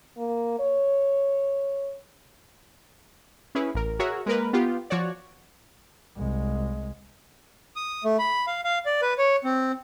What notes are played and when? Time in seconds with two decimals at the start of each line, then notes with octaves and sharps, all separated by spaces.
0.18 A#3
0.60 C#5
3.55 C#4 E4 G#4 B4
3.75 A1 A#4
3.99 F#4 G#4 A#4 C#5 E5
4.26 G#3 A#3 A#4 B4
4.53 B3 F4 G4
4.90 F3 F#4 C#5 D5
6.16 C2 G#3
7.76 D#6
8.04 A3
8.19 B5
8.47 F5
8.64 F5
8.86 D5
9.02 B4
9.18 C#5
9.44 C4